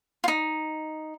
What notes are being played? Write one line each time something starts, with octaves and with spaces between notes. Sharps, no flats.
D#4 F4